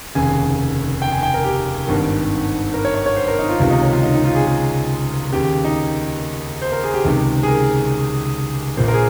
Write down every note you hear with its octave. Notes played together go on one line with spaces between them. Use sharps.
F1 D#2 C#3 G#5
G5
G#5
G5
A#4
G4
G#1 G2 D#3
A#4
C#5
C#5
C#5
C5
A#4
D#4
F4
C#2 C3 D#3 F4
D#4
C#4
F4
D#4
D#4
F4
G#4
G#4
D#2 C#3 G4
G4
D#4
C5
A#4
G#4
G4
C#2 C3 D#3
G#4
A#4
A#1 A#2 C5
A#4
G#4